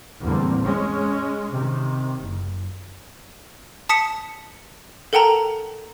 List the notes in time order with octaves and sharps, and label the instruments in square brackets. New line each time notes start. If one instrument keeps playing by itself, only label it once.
[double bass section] E2 A2 D3 G3 A#3 C4
G#3 C#4
C3 D#3
F#1
[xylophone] A5 D#6 B6 C#7 E7
A4 A#4 F#5 G5 A5 A#5